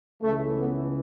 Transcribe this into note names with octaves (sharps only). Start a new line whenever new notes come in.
C#2 C#3 E3 A3
B3